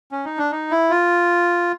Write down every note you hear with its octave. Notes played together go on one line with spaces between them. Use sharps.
C#4
D#4
D4
D#4
E4
F4